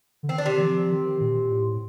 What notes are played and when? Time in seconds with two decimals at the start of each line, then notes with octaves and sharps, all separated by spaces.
0.23 D3
0.29 D#3 C4
0.38 D4
0.46 C3 C4
0.60 F3
0.90 D#3
1.20 A#2
1.50 A2